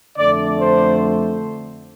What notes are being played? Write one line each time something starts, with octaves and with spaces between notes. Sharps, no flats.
F2 D3 A3 D5
C5